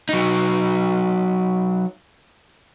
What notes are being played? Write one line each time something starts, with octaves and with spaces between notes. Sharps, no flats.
F#3 D#4